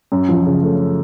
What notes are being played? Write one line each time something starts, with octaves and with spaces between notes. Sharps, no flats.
F#2
F3
C#3
A3